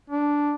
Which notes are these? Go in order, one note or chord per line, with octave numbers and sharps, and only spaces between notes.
D4